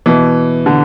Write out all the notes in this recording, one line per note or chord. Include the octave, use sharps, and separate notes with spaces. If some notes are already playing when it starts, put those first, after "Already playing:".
B2 E3
D3